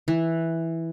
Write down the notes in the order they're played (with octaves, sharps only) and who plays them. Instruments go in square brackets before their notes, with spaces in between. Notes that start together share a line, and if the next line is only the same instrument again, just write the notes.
[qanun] E3